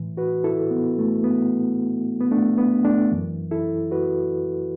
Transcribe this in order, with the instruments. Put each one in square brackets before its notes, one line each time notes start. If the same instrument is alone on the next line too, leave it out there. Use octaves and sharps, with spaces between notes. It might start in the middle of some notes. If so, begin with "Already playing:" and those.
Already playing: [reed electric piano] A2 E3
F#4 B4
E4 A4
B3
A3
B3
B3
A3 D4
B3
A3 D4
F#2 E3
E4 A4
F#4 B4